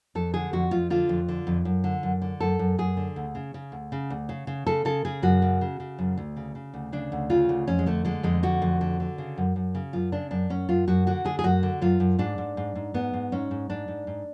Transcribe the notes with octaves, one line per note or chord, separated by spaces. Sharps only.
F2 A4
D3 G#4
F2 F#4
F2 F4
D3 F4
F2
D3
F2
F#2
D3
F#2
D3
F#2 A4
F#2
F#2 G#4
D3
D2
C#3
C#3
D2
C#3
D2
C#3
C#3
C#3 A4
C#3 A4
C#3 G#4
F#2 F#4
C#3
C#3
C#3
F#2
D2
C#3
C#3
D2
C#3 D4
D2
C#3 F4
D2
F2 C#4
G#3
D3 A3
D3 G#3
F2 G#3
D3 F#4
F2
D3
D3
C#3
F#2
F#2
C#3
F#2 F4
C#3 D4
F#2 D4
F#2 C#4
F#2 F4
F#2 F#4
D3 F#4
D3 G#4
G#4
F#2 F#4
D3
F#2 F4
F#2
G#2 D4
G#2
G#2
G#2
G#2 B3
G#2
G#2 C#4
G#2
G#2 D4
G#2
G#2